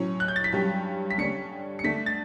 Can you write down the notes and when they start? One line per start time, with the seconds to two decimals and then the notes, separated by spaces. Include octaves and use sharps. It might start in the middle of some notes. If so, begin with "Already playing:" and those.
Already playing: A2 F#3 C#4
0.20 F#6
0.28 G6
0.36 A6
0.44 B6
0.52 G2 F#3 C#4 G4
1.10 B6
1.18 D3 G3 C#4 C#7
1.79 C#7
1.84 D3 A3 D4 B6
2.06 A6